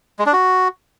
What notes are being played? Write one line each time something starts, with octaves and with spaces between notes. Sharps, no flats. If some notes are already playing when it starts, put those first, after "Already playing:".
G#3
D4
F#4